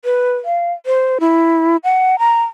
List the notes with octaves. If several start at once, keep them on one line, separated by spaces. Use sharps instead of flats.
B4
F5
C5
E4
F#5
A#5